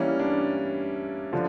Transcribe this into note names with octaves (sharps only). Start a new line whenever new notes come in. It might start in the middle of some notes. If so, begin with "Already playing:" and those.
Already playing: E3 G3 A#3 C#4 E4
D4
D3 F3